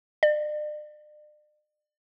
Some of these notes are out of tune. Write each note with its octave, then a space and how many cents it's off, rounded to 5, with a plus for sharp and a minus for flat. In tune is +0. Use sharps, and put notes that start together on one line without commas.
D5 +40